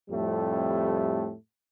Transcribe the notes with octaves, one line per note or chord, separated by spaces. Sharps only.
F2 A2 G3 A3 C4 G4